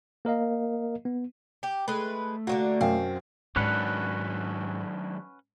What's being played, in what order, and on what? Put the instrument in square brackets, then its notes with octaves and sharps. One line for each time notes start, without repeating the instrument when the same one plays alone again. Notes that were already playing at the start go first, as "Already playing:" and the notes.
[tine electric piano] A#3 A#4 D#5 F5
B3
[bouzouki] G4
[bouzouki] G#3 B4 [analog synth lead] A3
[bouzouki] D3 F#3 A#3 [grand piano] F#4
[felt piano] F#2 F5 [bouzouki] C4
[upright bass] G#2 [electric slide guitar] D#3 F#3 D4 [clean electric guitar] C#4 B4 F#5